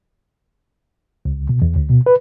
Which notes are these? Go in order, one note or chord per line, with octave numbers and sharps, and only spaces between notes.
C#2
B2
E2
D2
B2
B4